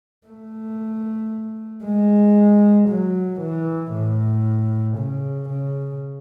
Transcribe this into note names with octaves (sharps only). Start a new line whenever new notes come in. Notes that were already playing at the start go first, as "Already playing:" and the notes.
A3
G#3
F#3
E3
A2
C#3
C#3